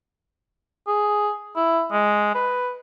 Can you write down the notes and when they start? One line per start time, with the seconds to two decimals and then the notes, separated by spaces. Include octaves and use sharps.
0.88 G#4
1.56 E4
1.92 G#3
2.35 B4